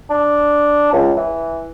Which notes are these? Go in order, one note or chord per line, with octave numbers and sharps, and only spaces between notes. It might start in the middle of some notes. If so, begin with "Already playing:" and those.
D4
C#2
E3